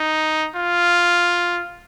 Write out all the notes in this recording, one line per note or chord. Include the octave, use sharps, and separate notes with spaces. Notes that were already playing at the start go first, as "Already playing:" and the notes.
Already playing: D#4
F4